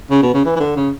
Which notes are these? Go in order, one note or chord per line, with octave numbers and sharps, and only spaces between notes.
C#3
B2
C#3
E3
E3
D3
C#3